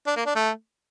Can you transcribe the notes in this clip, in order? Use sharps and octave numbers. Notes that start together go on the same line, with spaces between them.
D4
A#3
D4
A3